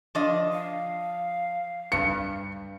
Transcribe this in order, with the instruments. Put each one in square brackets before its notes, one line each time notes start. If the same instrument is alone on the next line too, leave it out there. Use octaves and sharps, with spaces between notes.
[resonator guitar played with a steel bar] F3 D4 D#5
[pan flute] F5
[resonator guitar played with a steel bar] G2 [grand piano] C#7